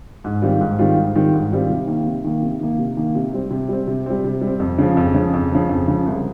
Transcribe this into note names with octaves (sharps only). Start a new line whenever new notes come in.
G#2
D#3 G3 C4 F4
G#2
D#3 G3 C4 F4
G#2
D#3 G3 C4 F4
G#2
D#3 G3 C4 F4
C3
D#3 A#3
C3
D#3 A#3
C3
D#3 A#3
C3
D#3 A#3
C3
G3 C4
C3
G3 C4
C3
G3 C4
C3
G3
C4
F2
C#3 F3
F2
C#3 F3
F2
C#3 F3
F2
C#3 F3
C2